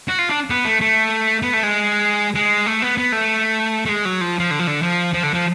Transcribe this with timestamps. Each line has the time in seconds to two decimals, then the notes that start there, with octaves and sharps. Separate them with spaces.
0.09 F#4
0.19 F4
0.29 D4
0.50 B3
0.65 A3
0.81 A3
1.42 B3
1.53 A3
1.63 G#3
2.35 G#3
2.66 A3
2.82 B3
2.97 B3
3.12 A3
3.86 A3
3.89 G#3
4.05 F#3
4.21 F3
4.39 F3
4.51 D3
4.59 F3
4.67 D3
4.82 F3
5.13 F3
5.23 D3
5.34 F3